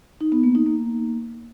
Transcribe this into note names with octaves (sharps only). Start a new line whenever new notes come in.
D#4
B3
A#3
D#4
A#3